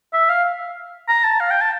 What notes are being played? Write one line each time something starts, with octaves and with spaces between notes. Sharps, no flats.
E5
F5
A#5
A5
F5
G5
A5